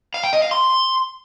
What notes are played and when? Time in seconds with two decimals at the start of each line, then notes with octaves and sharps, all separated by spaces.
0.14 F5
0.24 G5
0.33 D#5
0.42 F5
0.51 C6